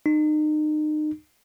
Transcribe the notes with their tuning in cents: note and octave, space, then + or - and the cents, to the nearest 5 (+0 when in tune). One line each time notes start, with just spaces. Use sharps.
D#4 -35